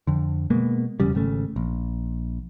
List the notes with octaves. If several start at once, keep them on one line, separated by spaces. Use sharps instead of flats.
F2 D3
B2 G#3 A#3 B3
F1 E2 C#3 G3
G#1 C#3 A3
A#1